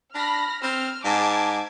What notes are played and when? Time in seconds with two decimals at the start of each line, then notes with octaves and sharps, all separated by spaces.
0.15 D4 B5 F6 A#6
0.63 C4 F6
1.05 G#2 A5 D6 G#6